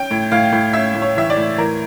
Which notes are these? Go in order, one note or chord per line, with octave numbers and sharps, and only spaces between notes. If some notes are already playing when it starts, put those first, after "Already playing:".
Already playing: C#4 G5
A2
A2 F5
A2
C#4 E5
A2
C#5
E3 E5
D5
A2
E3 A#4